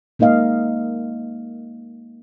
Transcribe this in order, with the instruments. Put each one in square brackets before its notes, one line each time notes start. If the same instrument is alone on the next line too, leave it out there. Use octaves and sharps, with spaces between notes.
[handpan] G#3 A#3 D#4 D#5 F5